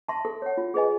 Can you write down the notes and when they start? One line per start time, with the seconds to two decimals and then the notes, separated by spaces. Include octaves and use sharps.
0.08 E5 A5 C6
0.25 A4
0.42 C#5 F#5
0.58 F4
0.74 G#4 B4 D#5 G#5